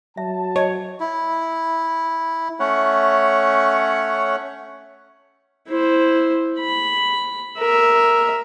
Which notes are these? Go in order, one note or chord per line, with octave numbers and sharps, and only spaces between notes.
F#3 E5 A5
C#5 D#5
E4
A3 C#4 C#5 F#5
E4 C5
B5
A#4 E5